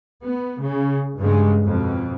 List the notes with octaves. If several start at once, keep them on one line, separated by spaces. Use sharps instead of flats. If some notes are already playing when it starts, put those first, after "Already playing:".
B3
C#3
G2 C#3 G#3
F2 B2